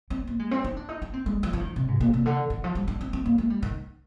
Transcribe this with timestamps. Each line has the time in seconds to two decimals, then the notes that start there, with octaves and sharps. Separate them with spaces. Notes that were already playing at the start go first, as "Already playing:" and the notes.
0.10 C4
0.27 A#3
0.39 G#3
0.51 C4
0.64 D#4
0.77 D4
0.89 D#4
1.02 D4
1.14 C4
1.26 G#3
1.43 F3
1.53 F3
1.60 D#3
1.76 C3
1.88 G#2
2.00 A#2
2.14 C3
2.26 D3
2.50 D#3
2.64 F3
2.75 G3
2.88 D4
3.01 C4
3.13 C4
3.26 A#3
3.38 G#3
3.50 G3
3.63 D#3